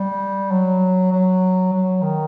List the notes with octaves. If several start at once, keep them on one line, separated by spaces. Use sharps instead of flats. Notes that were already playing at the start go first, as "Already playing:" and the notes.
Already playing: G3
F#3
F#3
F#3
D#3